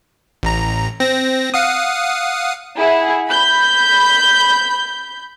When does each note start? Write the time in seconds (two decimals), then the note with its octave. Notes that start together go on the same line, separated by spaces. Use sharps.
0.43 A1 A#5
1.00 C4 A#6
1.54 F5 F#5 D#6
2.77 E4 G#4 F#5
3.28 B5 G6